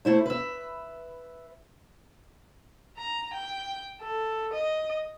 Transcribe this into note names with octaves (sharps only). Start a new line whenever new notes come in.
A3 E4 C5
B4 E5
A#5
G5
A4
D#5